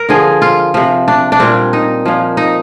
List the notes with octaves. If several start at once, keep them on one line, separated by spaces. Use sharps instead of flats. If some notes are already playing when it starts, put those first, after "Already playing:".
Already playing: A#4
D3 F3 G#4
F4
C3 F3
D4
D4
A#2 G3 C4
D#4
A#2 F3
D#4